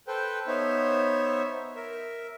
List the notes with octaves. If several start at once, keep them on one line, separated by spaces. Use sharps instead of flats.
A4 B4 C5 G5
B3 D#4 C5 C#5 E5
A#4 E5